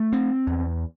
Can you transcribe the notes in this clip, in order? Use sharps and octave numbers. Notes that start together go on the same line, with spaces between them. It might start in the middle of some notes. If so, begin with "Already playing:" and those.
Already playing: A3
C4
E2